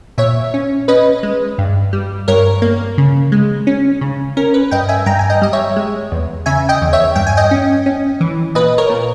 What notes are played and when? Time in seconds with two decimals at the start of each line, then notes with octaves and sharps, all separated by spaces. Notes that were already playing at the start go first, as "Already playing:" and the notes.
0.18 A#2 C#5 E5
0.54 C#4
0.88 C#4 B4 D#5
1.23 G#3
1.58 G2
1.93 G3
2.28 G2 A#4 C#5
2.62 A#3
2.98 C#3
3.32 G#3
3.67 C#4
4.01 C#3
4.37 C#4 A#4
4.54 B4
4.71 G2 D#5 G5
4.89 E5 G#5
5.06 G2 G5 A#5
5.19 G#5
5.30 D#5 G5
5.42 G3 D#5
5.53 C#5 E5
5.76 G#3
6.12 E2
6.46 C#3 E5 G#5
6.69 D#5 G5
6.81 E2
6.93 C#5 E5
7.16 G2 G5
7.26 G#5
7.37 D#5 G5
7.51 C#4
7.86 C#4
8.21 E3
8.55 A#2 B4 D#5
8.78 A#4 C#5
8.90 A#2